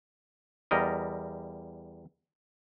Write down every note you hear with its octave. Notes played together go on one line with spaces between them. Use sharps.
E2 G3 A#4 D#5